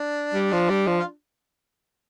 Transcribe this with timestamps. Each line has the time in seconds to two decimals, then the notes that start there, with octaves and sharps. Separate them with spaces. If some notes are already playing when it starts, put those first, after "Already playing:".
Already playing: D4
0.34 G3
0.52 F3
0.70 G3
0.87 F3
0.99 F4